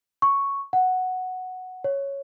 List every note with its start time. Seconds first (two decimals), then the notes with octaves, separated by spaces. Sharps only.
0.22 C#6
0.73 F#5
1.84 C#5